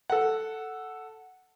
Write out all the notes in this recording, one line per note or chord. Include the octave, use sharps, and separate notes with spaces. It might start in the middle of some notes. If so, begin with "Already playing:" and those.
A4 F#5